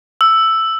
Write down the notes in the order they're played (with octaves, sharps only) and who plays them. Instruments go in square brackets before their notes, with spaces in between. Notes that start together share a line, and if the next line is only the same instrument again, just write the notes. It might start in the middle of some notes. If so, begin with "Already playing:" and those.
[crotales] E6